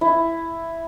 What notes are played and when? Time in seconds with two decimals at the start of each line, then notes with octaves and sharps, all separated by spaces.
0.01 E4